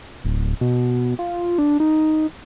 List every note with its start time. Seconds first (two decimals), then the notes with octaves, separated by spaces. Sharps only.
0.25 D1
0.61 B2
1.19 F4
1.58 D4
1.80 D#4